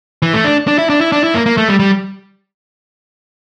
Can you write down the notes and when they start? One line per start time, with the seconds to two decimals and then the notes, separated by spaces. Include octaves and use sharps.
0.22 E3
0.33 A3
0.44 D4
0.68 D4
0.79 E4
0.90 D4
1.01 E4
1.12 D4
1.24 E4
1.35 A#3
1.46 A#3
1.57 A3
1.69 G3
1.80 G3